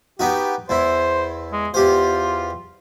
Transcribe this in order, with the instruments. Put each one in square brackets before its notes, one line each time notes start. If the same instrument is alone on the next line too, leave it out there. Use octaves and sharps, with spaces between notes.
[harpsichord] B3 D#4 F#4 [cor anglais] G4
[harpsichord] E2 E4 [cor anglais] C5
[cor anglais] G#3
[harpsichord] E2 G4 C5 [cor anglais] F4